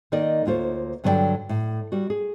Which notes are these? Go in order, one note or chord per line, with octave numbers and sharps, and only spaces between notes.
D#3 A#3 D#4 A#4 D5 D#5
D2 A#3 F4 C5 C#5
G2 D3 F#3 B4 D5 G5
A2
G3 F#4
G#4